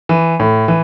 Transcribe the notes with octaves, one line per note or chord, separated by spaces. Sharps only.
E3
A2
E3